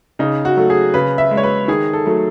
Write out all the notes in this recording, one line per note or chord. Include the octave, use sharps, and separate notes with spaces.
C#3 D#4
F#4
F#3 A3
G#4
C#3 B4
E5
G#3
C#5
B4
D#3 G#4
A4
F#3 A3